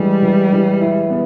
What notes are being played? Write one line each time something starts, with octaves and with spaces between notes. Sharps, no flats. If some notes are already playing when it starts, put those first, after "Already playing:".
Already playing: E3 G3 G#3
E3
E3
E4
B3